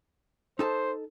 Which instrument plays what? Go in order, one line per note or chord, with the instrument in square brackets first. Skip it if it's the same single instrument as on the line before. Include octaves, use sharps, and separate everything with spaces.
[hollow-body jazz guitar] D#4 A4 A5 [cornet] C5